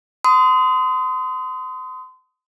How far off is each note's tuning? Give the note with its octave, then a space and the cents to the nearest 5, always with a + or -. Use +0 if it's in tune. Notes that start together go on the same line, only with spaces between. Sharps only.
C6 -35 D#6 +10